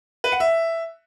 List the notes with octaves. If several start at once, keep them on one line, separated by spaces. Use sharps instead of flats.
B4
F#5
E5